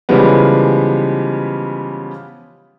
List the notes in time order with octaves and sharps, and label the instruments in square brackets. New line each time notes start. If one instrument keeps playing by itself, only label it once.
[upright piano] C#3 E3 F3 G3 G#3 B3